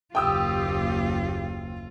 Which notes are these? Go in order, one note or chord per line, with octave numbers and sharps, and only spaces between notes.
F#1 D#2 F4 G4 G5 D#6 E6